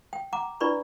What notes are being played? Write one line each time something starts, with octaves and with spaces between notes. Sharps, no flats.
G5
F#5 A#5 D6
D4 E4 B4 D5 B5 C#6